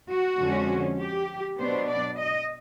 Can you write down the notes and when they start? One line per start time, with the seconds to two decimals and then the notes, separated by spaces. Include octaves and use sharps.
0.10 F#4
0.40 F2 D3 F3 G#3 C#4
0.99 G4
1.58 B2 F#3 B3 D4 C5
1.88 D5
2.17 D#5